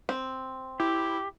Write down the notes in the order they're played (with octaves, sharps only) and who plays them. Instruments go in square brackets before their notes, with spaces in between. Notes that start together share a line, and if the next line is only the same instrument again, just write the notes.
[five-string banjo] C4
[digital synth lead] E4 [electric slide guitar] G4